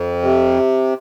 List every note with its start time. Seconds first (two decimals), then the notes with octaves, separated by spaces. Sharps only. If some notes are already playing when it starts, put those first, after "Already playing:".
Already playing: F2
0.22 C3